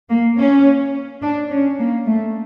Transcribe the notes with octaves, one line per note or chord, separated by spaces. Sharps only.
A#3
C#4
D4
C#4
A#3
A3